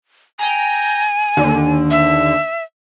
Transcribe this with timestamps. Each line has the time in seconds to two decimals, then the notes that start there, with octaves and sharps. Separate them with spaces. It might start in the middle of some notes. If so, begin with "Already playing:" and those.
0.39 G5 G#5 A#5
1.37 D#2 D3
1.91 E5